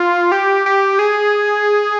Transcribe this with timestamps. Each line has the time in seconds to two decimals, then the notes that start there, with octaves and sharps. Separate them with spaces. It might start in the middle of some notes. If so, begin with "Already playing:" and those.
Already playing: F4
0.32 G4
0.66 G4
0.99 G#4